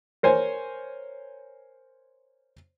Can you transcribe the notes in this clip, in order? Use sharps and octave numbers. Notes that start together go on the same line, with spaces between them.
A#4 C5 C#5 G#5